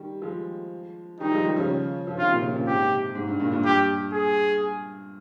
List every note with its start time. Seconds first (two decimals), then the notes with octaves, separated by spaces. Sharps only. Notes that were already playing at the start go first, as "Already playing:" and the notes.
Already playing: D#3 G3
0.22 F3 G#3
1.20 D#3 G3 D#4
1.32 F3 G#3
1.44 D#3 G3
1.56 C#3 F3
2.07 F3
2.17 C3 D#3 F4
2.30 A#2 C#3
2.42 A#2 C#3
2.54 A#2 C#3
2.67 G#2 C3 G4
3.15 G#2
3.28 G2
3.40 G2 A#2
3.52 G2 A#2
3.64 G2 G4
4.13 G#4